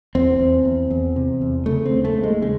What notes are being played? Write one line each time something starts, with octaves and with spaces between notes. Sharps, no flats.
E2 C4
E2
E2
E2
C3
E2
C#3 A3
C4
D#2
A3
D#2
G#3
C#3 G#3